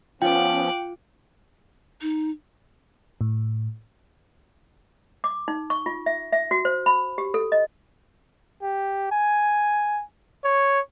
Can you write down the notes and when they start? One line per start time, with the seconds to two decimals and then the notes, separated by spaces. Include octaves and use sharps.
0.22 F3 B3 C#4 F4 G5 D6 F#6
2.02 D#4
3.21 A2
5.24 D6
5.48 D#4
5.70 C#6
5.86 F4
6.06 E5
6.32 E5
6.51 F#4
6.65 C5
6.86 B5
7.18 G4
7.34 A4
7.52 D#5
8.62 G4
9.12 G#5
10.44 C#5